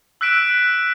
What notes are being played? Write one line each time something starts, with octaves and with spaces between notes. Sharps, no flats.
E6 F#6 B6 D7 E7